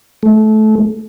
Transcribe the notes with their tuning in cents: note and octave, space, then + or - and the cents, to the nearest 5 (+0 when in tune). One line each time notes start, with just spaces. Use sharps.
A3 -25